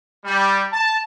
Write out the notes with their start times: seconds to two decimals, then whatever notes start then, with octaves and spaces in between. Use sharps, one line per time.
0.23 G3
0.72 A5